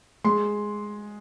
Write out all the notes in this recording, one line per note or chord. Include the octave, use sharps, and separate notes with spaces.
G#3 C6